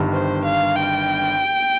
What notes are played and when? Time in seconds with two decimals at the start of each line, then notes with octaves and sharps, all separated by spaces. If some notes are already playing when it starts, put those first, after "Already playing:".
Already playing: G1 G2 D#3
0.13 C5
0.45 F5
0.76 G5